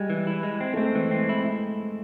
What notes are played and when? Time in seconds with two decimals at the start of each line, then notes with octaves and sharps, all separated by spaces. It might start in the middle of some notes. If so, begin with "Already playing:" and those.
Already playing: G3 G#3
0.10 E3
0.27 E4
0.43 G#3
0.60 C4
0.74 A3
0.77 G#3 C4
0.95 E3
1.11 C4
1.29 E4